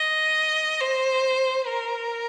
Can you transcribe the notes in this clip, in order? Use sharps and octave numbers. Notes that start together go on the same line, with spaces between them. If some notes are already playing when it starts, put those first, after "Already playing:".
Already playing: D#5
C5
A#4